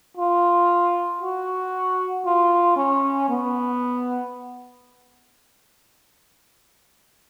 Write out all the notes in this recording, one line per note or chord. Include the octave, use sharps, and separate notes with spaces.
F4
F#4
F4
C#4
B3